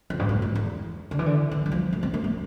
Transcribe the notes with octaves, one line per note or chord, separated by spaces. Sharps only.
F2
G2
A2
F2
E2
D3
E3
D3
E3
G3
F3
A3
C4
A#3
F3